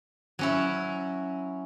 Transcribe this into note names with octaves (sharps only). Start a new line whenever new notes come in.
F#3 C#4 E4